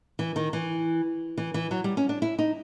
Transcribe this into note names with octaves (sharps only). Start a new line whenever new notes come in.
E3
D#3
E3
E3
E3
F#3
G3
C#4
D4
E4
D#4